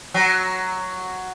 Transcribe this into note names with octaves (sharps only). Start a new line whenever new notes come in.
F#3